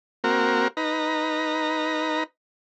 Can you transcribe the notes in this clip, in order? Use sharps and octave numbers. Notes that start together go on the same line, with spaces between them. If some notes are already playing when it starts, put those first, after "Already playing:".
A#3 C4 F#4 A#4
D#4 B4 A#5